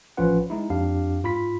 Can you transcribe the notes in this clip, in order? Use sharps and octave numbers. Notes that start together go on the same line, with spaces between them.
A1 F3 C#4 F4 B4 F#5
G#3 D#4 E4
F2 D4 G4 F5
G#2 F4 B5 B6